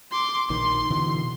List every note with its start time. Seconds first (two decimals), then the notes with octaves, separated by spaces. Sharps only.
0.11 C6 D6
0.50 A#1 D#3 C6
0.90 B2 D3 E3